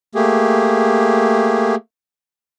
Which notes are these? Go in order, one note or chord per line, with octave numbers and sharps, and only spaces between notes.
A3 A#3 G4 G#4